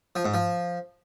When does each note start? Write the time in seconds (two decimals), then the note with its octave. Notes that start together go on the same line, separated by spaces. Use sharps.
0.16 F3
0.25 G#2
0.34 F3